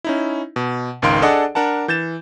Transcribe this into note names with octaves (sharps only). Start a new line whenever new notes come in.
C#4 D#4 E4
B2
G#1 C#2 D#3 F5 C6 D7
D4 G#4 A4 D5 D#5 F#5
D4 A#4 F#5 A5
E3 G6 A6 E7